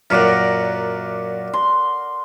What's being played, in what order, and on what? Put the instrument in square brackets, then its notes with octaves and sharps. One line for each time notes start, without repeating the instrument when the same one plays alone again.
[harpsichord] F#2 A#2 [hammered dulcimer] A#4 D5 F#5
[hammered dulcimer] C6